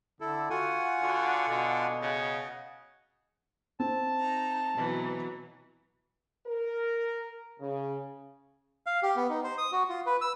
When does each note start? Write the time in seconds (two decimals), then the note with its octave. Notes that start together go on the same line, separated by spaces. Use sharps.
0.21 D3 E4 A4
0.50 F4 F#4 F#5 G#5
1.01 D3 F#4
1.49 B2 D3
2.01 C#3 D#5 F#5
3.80 C4 A5
4.20 D#4 A#5
4.75 B2 E3 F#3
6.47 A#4
7.60 C#3
8.86 F5
9.03 G4
9.16 B3
9.29 D#4
9.44 C5
9.58 D#6
9.72 F#4
9.89 F4
10.06 B4
10.21 E6